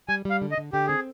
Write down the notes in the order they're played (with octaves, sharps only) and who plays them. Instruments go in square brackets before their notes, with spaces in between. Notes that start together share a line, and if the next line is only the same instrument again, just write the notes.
[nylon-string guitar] G3 [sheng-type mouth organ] G#5
[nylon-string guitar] G3 [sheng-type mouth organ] F5
[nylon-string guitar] D3
[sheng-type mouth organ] D#5
[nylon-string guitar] D3
[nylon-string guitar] D3 [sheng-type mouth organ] G4
[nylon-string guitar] C4 [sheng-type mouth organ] G#4